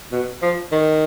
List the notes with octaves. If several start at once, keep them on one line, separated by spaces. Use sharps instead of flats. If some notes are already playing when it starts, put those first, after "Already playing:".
B2
F3
D#3